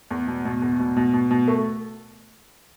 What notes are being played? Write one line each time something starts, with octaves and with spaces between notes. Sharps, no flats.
E2
B2
B2
E2
B2
B2
B2
B2
A3